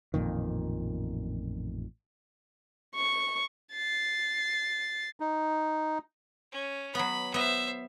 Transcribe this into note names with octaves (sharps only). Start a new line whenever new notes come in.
A1 F2 A#2 D#3
C#6
A6 C7
D#4
C#4
F#3 B3 B5
B3 C5 E5